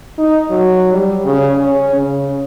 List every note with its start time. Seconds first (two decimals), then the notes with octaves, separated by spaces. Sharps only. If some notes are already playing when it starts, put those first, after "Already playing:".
0.18 D#4
0.51 F#3
0.93 G3
1.25 C#3
1.58 C#4
1.95 C#3